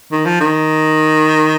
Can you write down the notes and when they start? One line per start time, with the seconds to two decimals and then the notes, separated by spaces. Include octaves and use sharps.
0.12 D#3
0.26 F3
0.41 D#3